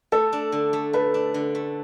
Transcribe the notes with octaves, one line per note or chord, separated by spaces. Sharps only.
A3 A4
D4
D3
A3
A3 B4
D4
D3
A3